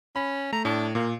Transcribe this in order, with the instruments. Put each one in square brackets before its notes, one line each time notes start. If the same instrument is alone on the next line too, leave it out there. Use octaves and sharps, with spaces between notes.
[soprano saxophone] C#4 [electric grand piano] B5
[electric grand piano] A3 [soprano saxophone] A#5
[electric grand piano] A2 [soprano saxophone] D4
[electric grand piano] A#2 [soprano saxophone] A#3